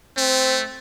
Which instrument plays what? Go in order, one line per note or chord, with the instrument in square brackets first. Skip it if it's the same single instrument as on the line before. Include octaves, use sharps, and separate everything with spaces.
[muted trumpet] A3 [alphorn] C4